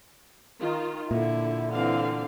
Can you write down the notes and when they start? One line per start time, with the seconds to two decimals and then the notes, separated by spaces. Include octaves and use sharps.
0.59 D#3 F4
1.11 A#2 D3 E4
1.73 D3 E3 C4 F5